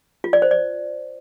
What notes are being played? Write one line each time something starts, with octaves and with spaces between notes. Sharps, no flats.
F4
D5
C5
D5